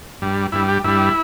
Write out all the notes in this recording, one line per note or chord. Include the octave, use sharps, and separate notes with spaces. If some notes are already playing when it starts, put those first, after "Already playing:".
G2 G3
G2 G3 E4
G4
G2 G3 E4